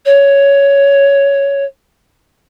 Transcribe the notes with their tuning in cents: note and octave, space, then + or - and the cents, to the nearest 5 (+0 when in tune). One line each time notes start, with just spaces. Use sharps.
C#5 +10